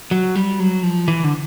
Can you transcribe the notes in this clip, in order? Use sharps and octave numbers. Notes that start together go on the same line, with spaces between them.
F#3
G3
F#3
F3
E3
D3